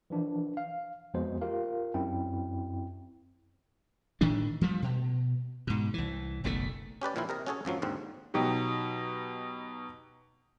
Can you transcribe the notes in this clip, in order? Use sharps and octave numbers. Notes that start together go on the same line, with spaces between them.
E3 F3 D4
F5
F2 F3 G#3 B3 F#4 C5
F4 G4 A#4 F5
F#2 C4 E4 G5
A2 D#3 E3 D4
F3 G3 A3
B2
G#2 B2
C2 E3
F#1 B1 C3 A3
C#4 G4 B4 D5
A#2 D#3 F3 A#3 E4 F4
C3 A#4 D#5 A#5
C#4 F#4 G#4 A4 C#5
G#1 F#2 F3 F#3
D#2 G#2 D3 C4
B2 F#3 D#4 G4